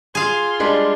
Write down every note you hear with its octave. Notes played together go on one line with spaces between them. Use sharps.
F4 G#4 F5 C6
G3 G#3 D4